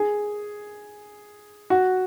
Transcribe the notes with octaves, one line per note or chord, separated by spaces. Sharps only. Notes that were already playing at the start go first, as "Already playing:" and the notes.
Already playing: G#4
F#4